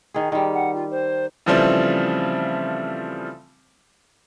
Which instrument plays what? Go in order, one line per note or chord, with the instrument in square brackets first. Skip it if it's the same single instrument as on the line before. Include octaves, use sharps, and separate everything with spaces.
[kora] D#3 G#4
D#3 G3
[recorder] F#5
F4
C5
[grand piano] C#3 E3 F3 G3 A3 C4